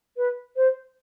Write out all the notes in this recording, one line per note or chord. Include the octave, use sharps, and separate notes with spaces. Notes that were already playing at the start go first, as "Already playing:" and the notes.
B4
C5